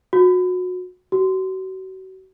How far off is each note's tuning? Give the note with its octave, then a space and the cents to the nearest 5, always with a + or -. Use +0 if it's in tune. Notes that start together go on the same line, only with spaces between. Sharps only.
F#4 -25
F#4 +35